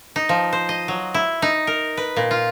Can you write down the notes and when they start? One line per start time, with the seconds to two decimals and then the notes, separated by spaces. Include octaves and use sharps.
0.16 D#4
0.29 F3
0.53 C5
0.69 D#5
0.88 F#3
1.14 E4
1.42 D#4
1.67 A#4
1.97 B4
2.17 A#2
2.31 F4